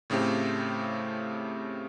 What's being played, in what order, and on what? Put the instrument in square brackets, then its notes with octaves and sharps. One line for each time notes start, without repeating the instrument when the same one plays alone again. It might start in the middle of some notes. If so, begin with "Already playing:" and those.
[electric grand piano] A2 C#3 A3 C4 G4